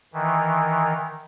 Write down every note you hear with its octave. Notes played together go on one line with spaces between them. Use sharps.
D#3 E3